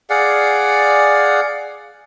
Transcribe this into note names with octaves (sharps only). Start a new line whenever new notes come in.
G#4 D5 F5 F#5